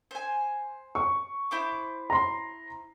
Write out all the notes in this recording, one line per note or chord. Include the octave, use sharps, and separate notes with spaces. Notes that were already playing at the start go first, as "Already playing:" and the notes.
C5 G#5
C#6
E4 C5 D6
A#5 C6